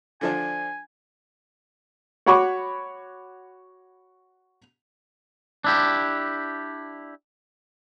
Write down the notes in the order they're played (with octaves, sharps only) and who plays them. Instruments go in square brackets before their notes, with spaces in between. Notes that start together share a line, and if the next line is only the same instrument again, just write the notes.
[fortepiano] D3 F3 D4 [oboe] G#5
[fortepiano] F#4 C#5 F#5 B5 C#6 D6
[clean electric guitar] D4 E4 G4